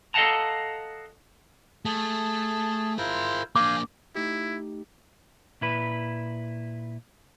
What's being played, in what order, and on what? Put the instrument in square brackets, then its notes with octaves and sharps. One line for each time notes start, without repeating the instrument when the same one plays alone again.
[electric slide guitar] A4 D#5 F5 F#5 A5 A#5
[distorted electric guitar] A3 [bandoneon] G#4 A5
[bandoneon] E4 F4 C5 [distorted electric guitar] G#4 A#4
[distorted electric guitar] A#3 D4 [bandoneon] F5 G#5 G6 [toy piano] D6
[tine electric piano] A3 D#4 G4 [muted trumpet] E4
[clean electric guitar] A#2 E4 B4